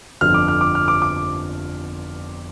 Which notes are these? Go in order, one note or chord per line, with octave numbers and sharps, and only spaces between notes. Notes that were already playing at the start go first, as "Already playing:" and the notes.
G1 F2 D3 F3 F6
D6
F6
D6
F6
D6
D6